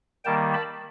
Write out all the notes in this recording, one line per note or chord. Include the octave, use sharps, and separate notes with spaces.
D#3 G3 A#3 G5 A5
A5 B5